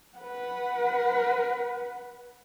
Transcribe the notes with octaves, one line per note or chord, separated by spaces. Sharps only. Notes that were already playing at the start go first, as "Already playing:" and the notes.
B4 F#5